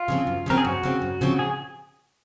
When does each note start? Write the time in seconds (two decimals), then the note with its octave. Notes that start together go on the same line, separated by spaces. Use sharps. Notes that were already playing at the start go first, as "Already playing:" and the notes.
Already playing: F4
0.08 C#3 F3 C4
0.27 F#2
0.46 C#3 F3 C4 A#4
0.58 G#4
0.65 F#2 F#4
0.83 C#3 F3 C4
1.02 F#2
1.21 C#3 F3 C4
1.39 G#4